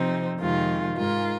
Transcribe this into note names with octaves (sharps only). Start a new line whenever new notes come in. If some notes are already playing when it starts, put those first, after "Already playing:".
Already playing: C3 F3 C4 D#4 C5
F2 C3 D#3 G#3 F4
G#2 G#3 F4 A#4